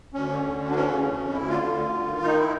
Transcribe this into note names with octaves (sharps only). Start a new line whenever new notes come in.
D2 C#4
D3
D3
D2
D4
E3 C#4
C#3
F2
F2
D2 E4
D3 F4
D3
D2
G2
D#3
D#3 D#4
E4